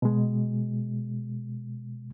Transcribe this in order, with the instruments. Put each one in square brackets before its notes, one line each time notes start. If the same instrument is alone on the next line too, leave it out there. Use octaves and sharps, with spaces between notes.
[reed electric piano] B2 G#3